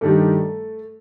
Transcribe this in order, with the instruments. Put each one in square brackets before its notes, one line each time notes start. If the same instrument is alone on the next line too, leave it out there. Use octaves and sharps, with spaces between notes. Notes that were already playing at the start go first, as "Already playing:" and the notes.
[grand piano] G2 D#3 G3 [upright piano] A3 A4